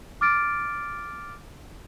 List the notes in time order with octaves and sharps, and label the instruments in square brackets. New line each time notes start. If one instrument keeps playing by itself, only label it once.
[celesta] D6 F6 A6 D7